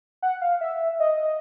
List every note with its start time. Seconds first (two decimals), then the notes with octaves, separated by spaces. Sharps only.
0.22 F#5
0.42 F5
0.61 E5
1.00 D#5